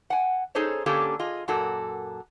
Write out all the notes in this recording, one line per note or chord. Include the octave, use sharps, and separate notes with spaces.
F#5 G#5
C#4 D#4 G#4 A4 C5 C#5
D3 A#3 C#4 D4 G4 A4
F4 G#4 D#5
F#2 A#2 A#3 F#4 A4